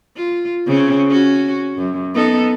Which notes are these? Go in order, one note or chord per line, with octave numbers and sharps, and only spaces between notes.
F4
C#3 C4 C#4
C#4 F#4
F#2
B3 D#4 A4